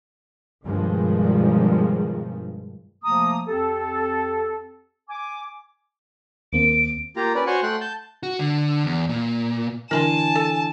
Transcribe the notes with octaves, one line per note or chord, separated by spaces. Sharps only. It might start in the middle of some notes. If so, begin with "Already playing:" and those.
G2 B2 D#3 F3 G3 G#3
C3 F3 A3 A#3 A#5 D#6
F2 C4 G4 A4
G#5 D6
D#2 A#3 C4 D7
A#3 F4 G4 A#5
C#4 B4 D5
F#4 C5 C#5 F#5 G#5 C#6
A3 F#5 G5 C6 F#6
A5 G6
F#4
D3
E2
A#2
D3 E3 A#4 G#5 A5 B5 C6
A4